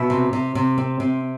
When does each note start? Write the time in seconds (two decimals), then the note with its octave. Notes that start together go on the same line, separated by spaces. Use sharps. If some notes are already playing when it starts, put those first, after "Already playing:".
Already playing: B2 E5
0.10 C3
0.33 C3
0.55 C3
0.78 C4
1.00 C3